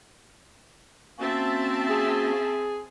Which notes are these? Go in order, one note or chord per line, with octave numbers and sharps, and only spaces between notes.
A#3 C4 C#4 F#4 E5 A5
G#4